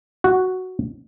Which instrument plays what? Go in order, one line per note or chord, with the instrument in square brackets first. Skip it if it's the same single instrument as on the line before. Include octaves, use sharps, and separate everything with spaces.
[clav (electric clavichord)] F#4